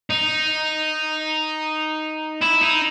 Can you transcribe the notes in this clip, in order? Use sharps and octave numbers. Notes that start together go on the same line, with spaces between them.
D#4
E4
D#4